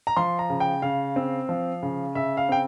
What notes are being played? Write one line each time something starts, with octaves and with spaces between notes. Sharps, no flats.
A#5
F3 C6
A#5
C#3
G5
C#3 F5
C4
F3
C#3
C#3 E5
F5
C4 G5